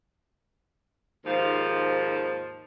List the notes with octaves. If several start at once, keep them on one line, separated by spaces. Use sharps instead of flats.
D#2 G#2 F3